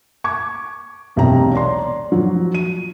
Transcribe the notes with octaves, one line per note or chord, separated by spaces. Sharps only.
C#6 D6 G#6
E1 B1 C3 G4 G5 A#5
C#5 D5 A#5 C6
D5
F3 F#3
D#7